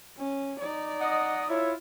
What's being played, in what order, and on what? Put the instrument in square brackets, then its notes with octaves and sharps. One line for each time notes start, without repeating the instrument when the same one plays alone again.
[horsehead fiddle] C#4
D#4 D5
[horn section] D#5 [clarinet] F#5
[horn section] E4 F4 [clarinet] C#5